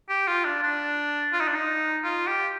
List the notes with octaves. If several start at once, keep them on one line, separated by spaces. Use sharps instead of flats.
G4
F4
D4
D4
F4
D#4
D4
D#4
F4
G4